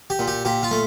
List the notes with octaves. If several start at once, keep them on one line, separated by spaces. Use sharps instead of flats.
G4
A#2
G4
A#2 G4
F4
A3